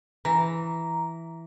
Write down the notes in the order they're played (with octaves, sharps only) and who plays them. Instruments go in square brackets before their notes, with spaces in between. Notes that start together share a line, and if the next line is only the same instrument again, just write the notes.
[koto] E3 [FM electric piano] A#5